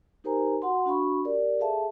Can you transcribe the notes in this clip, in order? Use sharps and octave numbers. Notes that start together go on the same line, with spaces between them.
D#4 G4 A#4 C5 G#5 A#5
F#4 F#5 C6
D4 F#4 F5 B5 C#6
G4 A#4 D5
G#4 A4 E5 F5 A5